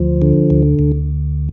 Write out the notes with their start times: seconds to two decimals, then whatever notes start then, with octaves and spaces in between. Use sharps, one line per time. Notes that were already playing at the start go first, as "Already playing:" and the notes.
Already playing: D2 F3
0.22 D3
0.50 D2
0.79 D2